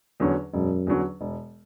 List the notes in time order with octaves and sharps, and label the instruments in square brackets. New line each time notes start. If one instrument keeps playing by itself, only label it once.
[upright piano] E2 D3 F#3 C#4
[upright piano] E1 [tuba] F#2
[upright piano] E2 D3 F#3 C#4
E1